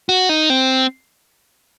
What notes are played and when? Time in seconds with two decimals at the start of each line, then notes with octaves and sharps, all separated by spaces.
0.09 F#4
0.29 D#4
0.50 C4